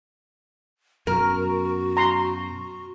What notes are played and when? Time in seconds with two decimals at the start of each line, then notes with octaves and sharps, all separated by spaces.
1.07 F#2 B2 F#4 A#4
1.97 A#5 C6